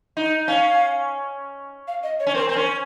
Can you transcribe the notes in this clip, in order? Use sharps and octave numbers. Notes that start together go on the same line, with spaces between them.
D#4
C#4 F5
F5
D#5
C#5
C#4
C4 A#4
C4
C#4